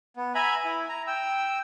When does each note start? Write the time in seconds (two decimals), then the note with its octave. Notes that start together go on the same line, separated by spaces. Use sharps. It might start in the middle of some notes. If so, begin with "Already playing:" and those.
0.17 B3
0.35 E5 G#5 A#5 B5
0.65 E4
0.89 A#5
1.07 G5 E6